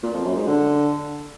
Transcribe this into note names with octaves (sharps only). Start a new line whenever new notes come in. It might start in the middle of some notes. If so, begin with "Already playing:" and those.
A#2
F2
F#2
G#2
D3